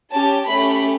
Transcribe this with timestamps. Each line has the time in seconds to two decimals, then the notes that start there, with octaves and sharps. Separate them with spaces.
0.13 C#4 G4 A5
0.49 A3 C#4 G4 B5